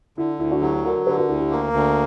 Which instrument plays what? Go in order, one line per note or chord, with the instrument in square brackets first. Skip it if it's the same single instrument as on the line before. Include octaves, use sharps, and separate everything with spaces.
[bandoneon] D3 [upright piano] E4
[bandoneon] D2 [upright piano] E4
[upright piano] D4 F#4
[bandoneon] F#3 [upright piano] E4 G4
[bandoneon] D3 [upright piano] F#4 A#4
[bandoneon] D3 [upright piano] G4 B4
[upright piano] F#4 A#4
[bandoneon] D2 [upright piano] E4 G4
[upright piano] E4 G4
[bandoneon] A#3
D2